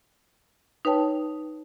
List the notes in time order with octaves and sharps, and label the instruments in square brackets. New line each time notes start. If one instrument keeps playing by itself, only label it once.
[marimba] D#4 B4 C#5 G5 A5